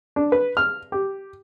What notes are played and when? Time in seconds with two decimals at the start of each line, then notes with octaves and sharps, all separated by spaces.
0.16 D4
0.32 B4
0.57 F6
0.92 G4